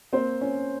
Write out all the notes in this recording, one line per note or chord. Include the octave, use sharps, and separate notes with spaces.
A#3 C4 C5
C#4